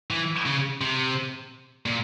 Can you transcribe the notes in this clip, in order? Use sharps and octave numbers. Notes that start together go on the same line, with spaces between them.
E3
C#3
C3
A#2